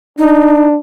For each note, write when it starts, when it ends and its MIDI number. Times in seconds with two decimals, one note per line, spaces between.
0.19 0.78 62
0.19 0.66 63